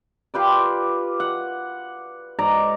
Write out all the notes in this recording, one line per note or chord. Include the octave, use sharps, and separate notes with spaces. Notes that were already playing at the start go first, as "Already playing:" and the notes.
F4 G4 B4 D5
F#5
G#2 D5 A#5